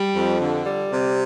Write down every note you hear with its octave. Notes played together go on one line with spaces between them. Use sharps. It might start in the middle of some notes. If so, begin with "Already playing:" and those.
Already playing: G3
F2
D3
G3
C3